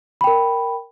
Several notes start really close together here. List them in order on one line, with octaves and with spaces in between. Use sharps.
B5 G5 A#4